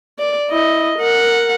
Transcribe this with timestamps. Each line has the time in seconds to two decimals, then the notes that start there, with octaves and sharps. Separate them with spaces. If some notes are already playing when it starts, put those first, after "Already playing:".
0.19 D5
0.50 E4 D#5
0.99 A#4 F#5